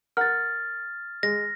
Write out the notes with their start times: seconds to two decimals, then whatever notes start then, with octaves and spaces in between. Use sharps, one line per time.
0.17 A#4 F#5 F6 A6
1.23 G#3 A#6